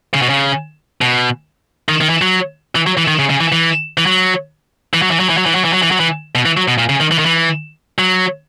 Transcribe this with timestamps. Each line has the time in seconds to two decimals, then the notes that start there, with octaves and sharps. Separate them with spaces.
0.14 C#3
0.22 B2
0.29 C#3
1.01 B2
1.89 D#3
2.01 D#3
2.10 E3
2.22 F#3
2.75 E3
2.87 F#3
2.97 E3
3.08 D#3
3.19 C#3
3.30 C#3
3.41 E3
3.52 E3
3.98 E3
4.06 F#3
4.94 E3
5.02 F#3
5.11 E3
5.20 F#3
5.29 E3
5.38 F#3
5.46 E3
5.55 F#3
5.65 E3
5.73 F#3
5.82 E3
5.91 F#3
6.00 E3
6.35 B2
6.46 E3
6.57 F#3
6.68 B2
6.79 A#2
6.89 C#3
7.00 D#3
7.11 E3
7.19 D#3
7.26 E3
7.99 F#3